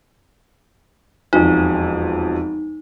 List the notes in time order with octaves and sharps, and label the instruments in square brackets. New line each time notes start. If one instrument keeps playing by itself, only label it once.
[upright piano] E1 F2 [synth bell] D#4